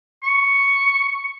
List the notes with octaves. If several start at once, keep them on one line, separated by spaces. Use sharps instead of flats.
C#6